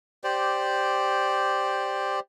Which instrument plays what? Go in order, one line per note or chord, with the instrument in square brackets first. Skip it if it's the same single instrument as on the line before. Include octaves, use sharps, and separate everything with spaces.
[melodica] G4 C5 D5